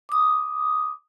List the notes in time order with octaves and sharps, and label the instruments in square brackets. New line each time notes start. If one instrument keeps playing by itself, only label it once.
[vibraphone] D6 D#6